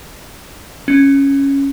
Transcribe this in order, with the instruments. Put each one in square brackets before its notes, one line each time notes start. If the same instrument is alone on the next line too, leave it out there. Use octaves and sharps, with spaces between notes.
[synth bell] C#4